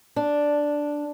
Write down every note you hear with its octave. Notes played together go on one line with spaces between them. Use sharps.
D4